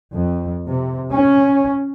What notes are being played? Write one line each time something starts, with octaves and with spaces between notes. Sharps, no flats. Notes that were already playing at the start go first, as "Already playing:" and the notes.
F2
C3
C#4